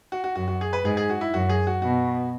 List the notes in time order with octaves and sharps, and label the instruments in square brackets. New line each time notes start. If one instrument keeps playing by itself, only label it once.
[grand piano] F#4
F#4
[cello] F#2 [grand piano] F#4
[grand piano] F#4
G#4
B4
[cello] G#2 [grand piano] G#4
[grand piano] G#4
F#4
E4
[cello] F#2 [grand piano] F#4
[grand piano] G#4
F#4
[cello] B2 [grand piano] F#4